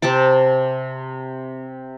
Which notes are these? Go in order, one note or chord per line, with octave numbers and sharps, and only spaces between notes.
C3 C4 A5 D6